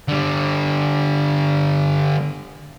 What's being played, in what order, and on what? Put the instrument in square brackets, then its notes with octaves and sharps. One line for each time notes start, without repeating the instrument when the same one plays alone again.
[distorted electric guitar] D3 G3